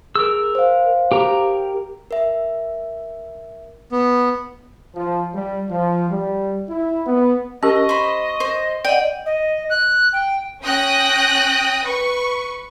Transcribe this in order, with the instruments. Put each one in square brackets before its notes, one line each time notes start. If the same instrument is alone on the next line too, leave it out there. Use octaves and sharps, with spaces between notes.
[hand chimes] G#4 [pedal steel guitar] A#4 E6
[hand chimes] C5 F5
[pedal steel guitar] G4 A#4 A#5
[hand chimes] A#4 E5
[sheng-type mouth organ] B3
[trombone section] F3
G3
F3
G3
E4
B3
[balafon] C#4 G4 A#4 [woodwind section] D#5 [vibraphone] C#6
[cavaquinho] C5 B5
C5
[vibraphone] D5 D#5 F#5 [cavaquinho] G5
[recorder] D#5
F#6
G5
[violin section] C#4 G5 D#6 F#6 A#6
B4 C#6